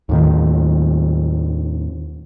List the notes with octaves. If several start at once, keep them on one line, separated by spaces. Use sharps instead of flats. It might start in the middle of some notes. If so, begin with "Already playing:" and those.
D#2 A2 D#3